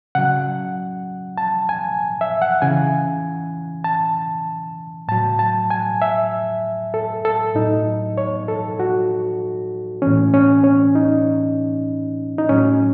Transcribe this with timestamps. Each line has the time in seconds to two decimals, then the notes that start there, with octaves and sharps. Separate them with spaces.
0.15 C#3 F#3 F#5
1.38 A5
1.69 G#5
2.21 E5
2.42 F#5
2.62 C#3 E3 G#5
3.84 A5
5.08 A2 F#3 A5
5.39 A5
5.70 G#5
6.02 E5
6.94 A4
7.25 A4
7.55 A2 F#3 D#4
8.18 C#5
8.48 A4
8.80 F#4
10.02 A2 E3 C#4
10.34 C#4
10.64 C#4
10.95 D#4
12.38 D#4
12.49 A2 F#3 C#4